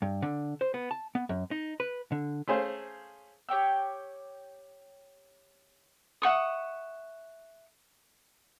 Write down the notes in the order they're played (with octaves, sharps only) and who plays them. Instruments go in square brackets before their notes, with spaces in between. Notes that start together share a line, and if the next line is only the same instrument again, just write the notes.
[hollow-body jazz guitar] G2
D3
C5
B3
A5
B3
F#2
D#4
B4
D3
[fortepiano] A3 C#4 G#4 C5 F5
[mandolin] G4 C#5 G5 E6
[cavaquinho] E5 F#5 C#6 D#6